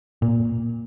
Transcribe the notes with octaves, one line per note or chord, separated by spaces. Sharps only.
A#2